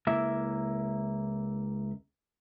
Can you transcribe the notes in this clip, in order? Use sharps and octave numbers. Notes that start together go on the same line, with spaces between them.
C#2 A#3 E4 E5